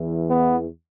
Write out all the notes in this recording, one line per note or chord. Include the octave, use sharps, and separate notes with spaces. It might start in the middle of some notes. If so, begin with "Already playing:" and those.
Already playing: E2 E3
B3